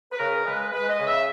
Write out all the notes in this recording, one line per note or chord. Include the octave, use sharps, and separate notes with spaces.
B4
C#3 A#4
G#3 B4
G#3 B4
D#5
C#3
E5